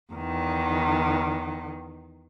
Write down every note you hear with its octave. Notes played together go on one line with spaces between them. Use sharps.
E2 D#3